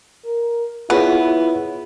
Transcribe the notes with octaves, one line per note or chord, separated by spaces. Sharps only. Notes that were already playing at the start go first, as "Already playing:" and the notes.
A#4
B3 E4 F4 G#4 C#5